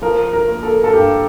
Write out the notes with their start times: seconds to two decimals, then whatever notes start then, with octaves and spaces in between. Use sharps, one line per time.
0.02 F3 A#4
0.33 A#4
0.48 A#3
0.63 A4
0.84 A4
0.93 G2 G4